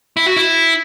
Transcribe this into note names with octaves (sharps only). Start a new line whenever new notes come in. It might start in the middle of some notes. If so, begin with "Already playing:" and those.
E4
F#4
E4